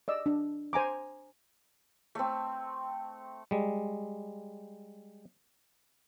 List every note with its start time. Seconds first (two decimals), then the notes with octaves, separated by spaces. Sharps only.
0.08 D5 D#5 E6
0.26 D4
0.73 C5 G#5 A#5 D6
2.15 A3 C4
3.51 G3 G#3